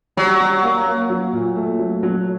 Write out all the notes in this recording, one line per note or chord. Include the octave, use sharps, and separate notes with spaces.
F#3 G3
G3
A#3
A#3
F#3
A#2
A3
F#3
F#3